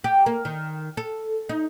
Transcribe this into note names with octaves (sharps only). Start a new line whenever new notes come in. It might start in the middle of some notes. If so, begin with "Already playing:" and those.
G4
A#3
D#3
A4
D#4